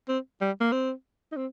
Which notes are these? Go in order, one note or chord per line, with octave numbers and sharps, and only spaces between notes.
C4
G3
A#3
C4
D#4
C4